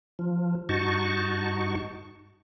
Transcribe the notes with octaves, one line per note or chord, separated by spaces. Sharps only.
F3
G2 D#4 F#4 A5 C#6